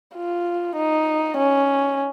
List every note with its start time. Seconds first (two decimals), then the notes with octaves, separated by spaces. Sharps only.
0.16 F4
0.76 D#4
1.37 C#4